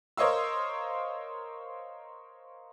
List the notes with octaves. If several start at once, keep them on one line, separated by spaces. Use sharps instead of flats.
A#4 C5 C#5 D#5 F5 E6